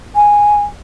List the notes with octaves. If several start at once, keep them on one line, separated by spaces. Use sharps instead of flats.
G#5